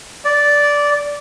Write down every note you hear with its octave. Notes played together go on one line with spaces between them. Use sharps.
D5